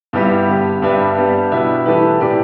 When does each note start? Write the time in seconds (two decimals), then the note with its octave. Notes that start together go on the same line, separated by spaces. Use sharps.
0.13 G2 G3 B3 E4 G4
0.47 D3 B3 G4
0.82 G2 G3 D4 B4 E5
1.17 G3 B3 D4 G4
1.51 B2 G3 E4 B4 E5
1.86 E3 A3 G4 B4
2.20 A2 E3 A3 G4 D5